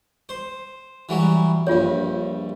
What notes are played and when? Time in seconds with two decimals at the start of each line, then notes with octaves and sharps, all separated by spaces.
0.29 C5
1.09 E3 F#3 G3
1.67 A#1 G2 F4 C#5